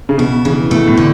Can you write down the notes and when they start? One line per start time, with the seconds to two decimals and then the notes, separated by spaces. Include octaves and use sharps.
0.09 C#3
0.18 B2 E4
0.45 C#3 E3
0.70 B2 A3
0.87 A2
0.97 D3